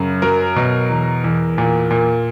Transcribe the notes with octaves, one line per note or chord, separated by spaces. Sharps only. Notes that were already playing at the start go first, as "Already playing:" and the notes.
Already playing: F#2 C#3
F#3 A#4
B2
E2
E2
A#2
A#2